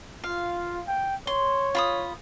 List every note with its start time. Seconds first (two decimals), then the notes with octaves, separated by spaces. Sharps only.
0.24 F4 F5
0.88 G5
1.27 C#5 C6
1.75 F4 B5 D#6